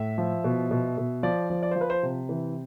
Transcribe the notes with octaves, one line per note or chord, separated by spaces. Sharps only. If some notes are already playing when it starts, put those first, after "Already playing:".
Already playing: A2 E5
F3
B2
B2
B2
F3 D5
F3
D5
C5
F3
B4
C5
C3
E3